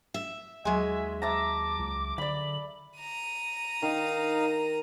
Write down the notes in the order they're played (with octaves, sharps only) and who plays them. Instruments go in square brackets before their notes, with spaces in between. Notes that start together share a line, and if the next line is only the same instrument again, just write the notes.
[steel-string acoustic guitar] E5
[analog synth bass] D#2 [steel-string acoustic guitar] F#3 G#5 [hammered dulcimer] G#3 [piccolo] E5
[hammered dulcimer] E5 A5 A#5 [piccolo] D6
[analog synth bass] C#2
[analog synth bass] D3 [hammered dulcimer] D5 B5 [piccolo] F#7
[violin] A#5 D#7
[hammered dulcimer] D#3 [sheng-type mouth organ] D#4 F5